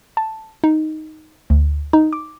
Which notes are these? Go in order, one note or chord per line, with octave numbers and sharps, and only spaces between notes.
A5
D#4
D2
D#4
D6